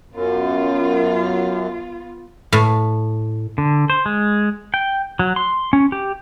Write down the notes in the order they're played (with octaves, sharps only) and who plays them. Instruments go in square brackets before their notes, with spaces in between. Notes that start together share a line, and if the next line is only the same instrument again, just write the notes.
[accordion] F#2 [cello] B3 F4
[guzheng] A2
[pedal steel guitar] D3
C5
G#3
G5
F#3
C6
C#4
G4